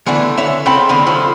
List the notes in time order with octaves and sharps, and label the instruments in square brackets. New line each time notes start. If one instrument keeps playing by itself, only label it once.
[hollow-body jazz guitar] D3 E3 A3 B3 D4
D3 C#5 E5
C#3 C4 A4 F#5 G5 B5
D3 D#3 B3
G2 F3 A4 B5